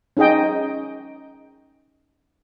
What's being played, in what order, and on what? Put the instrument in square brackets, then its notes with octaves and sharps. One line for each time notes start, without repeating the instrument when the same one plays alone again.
[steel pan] C#4 D#4 G#4 D#5 G5